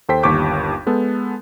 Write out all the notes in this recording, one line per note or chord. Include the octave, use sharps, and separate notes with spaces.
D#2 A4 C5 G5 B6
G1 D#2 G4 C#6 D6 G6
G#3 B3 A4